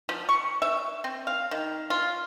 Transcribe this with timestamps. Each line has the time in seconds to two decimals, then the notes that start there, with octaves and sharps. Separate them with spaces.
0.09 F3
0.29 C#6
0.62 E5
1.04 C4
1.27 F5
1.51 D#3
1.90 F4